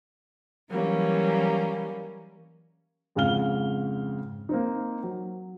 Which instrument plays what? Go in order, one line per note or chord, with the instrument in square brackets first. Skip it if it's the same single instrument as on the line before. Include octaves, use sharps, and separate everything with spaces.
[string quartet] E3 F#3 G3 A#3 C#4
[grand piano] F2 G#2 C#3 F5 F6 G7
A#3 C4 D#4
F#3